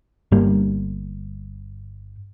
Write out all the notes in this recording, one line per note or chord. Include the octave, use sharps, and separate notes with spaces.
G1 G2 G3 A#3